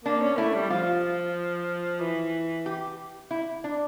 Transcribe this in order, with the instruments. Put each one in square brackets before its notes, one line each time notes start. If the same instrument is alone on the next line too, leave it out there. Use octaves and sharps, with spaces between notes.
[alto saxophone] A#3 [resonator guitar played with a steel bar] D4
[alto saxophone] C#4
[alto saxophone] A3 [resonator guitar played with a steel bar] E4
[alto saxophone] G3
[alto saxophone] F3 [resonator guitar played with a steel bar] F4
[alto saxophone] E3
[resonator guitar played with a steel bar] G4
E4
D4